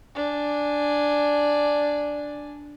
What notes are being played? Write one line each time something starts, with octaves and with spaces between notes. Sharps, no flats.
D4 G#5